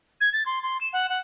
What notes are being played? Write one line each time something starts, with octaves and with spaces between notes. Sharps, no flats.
G#6
A6
C6
C6
E7
F#5
F#5